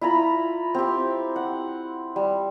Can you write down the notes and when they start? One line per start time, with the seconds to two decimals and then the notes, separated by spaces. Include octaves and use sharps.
0.01 E4 F4 A#5 B5
0.75 C4 G4
1.36 F#5
2.16 G3